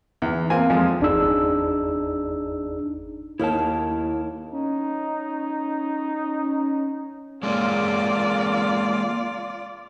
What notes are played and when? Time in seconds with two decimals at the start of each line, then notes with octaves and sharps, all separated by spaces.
0.22 E2
0.50 A#3 C4 F4 G#5
0.70 F2 F3 G#3
1.00 G1 E2 D4 D#4 G#4 E6
3.39 D#2 E4 A#4 A5
4.52 C#4 D#4
7.43 G#3 A#3 C#4 F4 D5